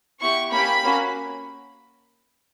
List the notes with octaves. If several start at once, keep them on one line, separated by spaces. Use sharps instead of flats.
B3 E4 G4 C#6
A#3 C#4 G4 B5
A#3 C#4 F#4